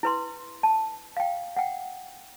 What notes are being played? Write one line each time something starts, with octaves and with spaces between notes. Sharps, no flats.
E4 B4 C6
A5
F5 G5
F#5 G5